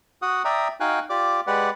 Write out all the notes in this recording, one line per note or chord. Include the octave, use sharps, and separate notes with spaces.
F#4 F#5 D#6
D5 E5 G5 A#5 D#6
D#4 F#4 F5 G5 G#5 F#6
F4 G4 D5 D6
G#3 G4 B4 D5 F#5